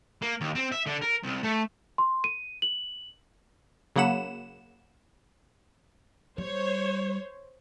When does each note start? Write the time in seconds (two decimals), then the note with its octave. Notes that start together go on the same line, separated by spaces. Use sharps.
0.22 A#3
0.41 D#2
0.55 C4
0.72 E5
0.87 D3
1.02 A#4
1.23 C2
1.43 A3
1.98 C6
2.24 D#7
2.62 F#7
3.96 C#3 F#3 A#3 F#5 B5 E7
6.38 G3 C5 C#5